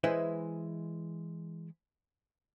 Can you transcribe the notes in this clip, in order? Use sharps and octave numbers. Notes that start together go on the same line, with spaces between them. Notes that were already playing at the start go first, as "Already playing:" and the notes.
E3 G#3 E4 B4 C5 D#5